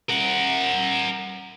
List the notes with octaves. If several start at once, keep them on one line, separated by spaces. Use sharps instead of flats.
A#4 F#5